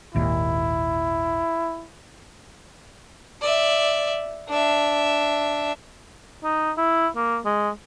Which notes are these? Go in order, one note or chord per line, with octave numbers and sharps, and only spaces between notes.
G#1 D#2 A#2 E4
D5 E5
D4 E5
D#4
E4
A#3
G#3